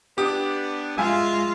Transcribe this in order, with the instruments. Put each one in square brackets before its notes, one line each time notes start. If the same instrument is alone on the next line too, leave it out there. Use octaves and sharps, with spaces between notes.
[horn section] B3 D4 [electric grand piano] G4 [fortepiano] D#6
[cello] G#3 F4 [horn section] E5 F5 [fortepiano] G#5